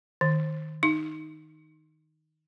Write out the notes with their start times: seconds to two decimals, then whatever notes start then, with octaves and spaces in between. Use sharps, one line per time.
0.21 D#3
0.83 D#4